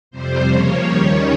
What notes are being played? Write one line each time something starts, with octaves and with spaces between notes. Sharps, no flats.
F2 C3 G3 C5
C#3 F3 A#3 C#5
D#2 D#3 G3 C#4